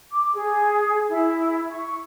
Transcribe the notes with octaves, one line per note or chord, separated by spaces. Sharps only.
D6
G#4
E4
C#6